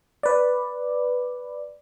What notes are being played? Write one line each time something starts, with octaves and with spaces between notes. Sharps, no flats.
B4 D5